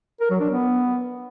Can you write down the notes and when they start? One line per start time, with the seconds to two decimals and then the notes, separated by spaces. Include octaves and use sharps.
0.20 A#4
0.30 F#3
0.40 D4
0.50 B3